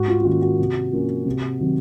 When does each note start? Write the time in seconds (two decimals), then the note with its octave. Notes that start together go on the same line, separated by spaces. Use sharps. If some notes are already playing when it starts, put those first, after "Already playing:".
Already playing: G#2 F#4
0.08 F4
0.20 F4
0.25 D#3 A#3 C#4 F#4
0.42 F#4
0.59 C3
0.92 F3 A#3 C#4
1.26 C3
1.60 D#3 F#3 C4